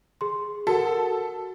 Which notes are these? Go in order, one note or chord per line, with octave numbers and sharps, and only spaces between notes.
G#4 C6
F#4 A4 A#4 F#5